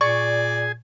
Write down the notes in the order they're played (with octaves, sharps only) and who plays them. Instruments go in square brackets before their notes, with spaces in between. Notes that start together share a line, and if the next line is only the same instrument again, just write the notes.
[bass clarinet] A#2 [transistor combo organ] G#4 G#5 [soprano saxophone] D5 [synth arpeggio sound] C#6